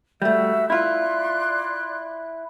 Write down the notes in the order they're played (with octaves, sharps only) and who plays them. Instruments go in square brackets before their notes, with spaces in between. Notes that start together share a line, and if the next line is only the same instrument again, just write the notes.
[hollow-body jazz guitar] G3 A3 [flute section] F#4 E5
[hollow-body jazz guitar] E4 F4 [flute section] D5 C6 F#6